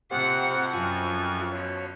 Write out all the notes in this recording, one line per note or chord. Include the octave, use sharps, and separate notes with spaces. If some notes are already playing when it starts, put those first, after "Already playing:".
F2 C3 G4 C5 F#5
F#2 F4 G#5
B2 D3 F3 C#5